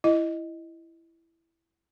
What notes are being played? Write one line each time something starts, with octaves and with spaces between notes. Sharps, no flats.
E4 D#5